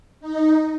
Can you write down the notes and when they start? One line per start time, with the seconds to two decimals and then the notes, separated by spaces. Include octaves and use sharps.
0.21 D#4